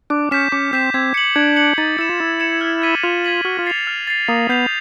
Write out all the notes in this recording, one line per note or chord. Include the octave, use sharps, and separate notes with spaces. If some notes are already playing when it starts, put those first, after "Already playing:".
D4 D6
C#4 G6 B6 E7
C#4 D6
C4 G6 B6 E7
C4 G#6
C#7 F#7
D4 G#6
C#7 F#7
D#4 A6
E4 C#7 E7
F4
E4 A6
C#7 E7
F6
G#6 B6 D#7 F#7
F4 F6
G#6 B6 D#7 F#7
F#4 F6
F4
A6 C7 F7
F6
A6 C7 F7
A#3 D#6
B3 G6 C7 F7